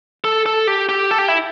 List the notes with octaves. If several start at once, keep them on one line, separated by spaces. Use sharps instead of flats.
A4
A4
G4
G4
A4
G4
E4